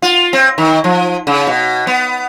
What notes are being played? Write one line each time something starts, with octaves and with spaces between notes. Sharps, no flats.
F4
C4
D#3
F3
C#3
B2
B3